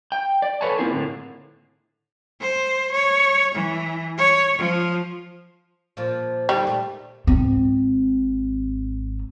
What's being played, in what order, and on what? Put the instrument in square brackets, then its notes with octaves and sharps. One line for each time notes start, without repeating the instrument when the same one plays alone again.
[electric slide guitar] G5
D5
A4 B4 C#5 F#5 G#5 A5
A#3 C4 E4 F4 G#4 A#4
A2 D3
[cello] C5
C#5
E3
C#5
F3
[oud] A#2 F3
[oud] D#2 D3 [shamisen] G3
[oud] A#2 A3
[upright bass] G#1 C4